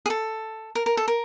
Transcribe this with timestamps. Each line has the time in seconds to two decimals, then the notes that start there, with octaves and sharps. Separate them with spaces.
0.06 G#4
0.10 A4
0.75 A#4
0.86 A#4
0.97 A4
1.08 A#4